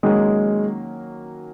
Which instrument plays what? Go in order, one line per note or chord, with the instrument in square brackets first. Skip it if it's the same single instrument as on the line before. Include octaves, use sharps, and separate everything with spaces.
[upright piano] D#3 F#3 A#3 C#4 [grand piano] G#3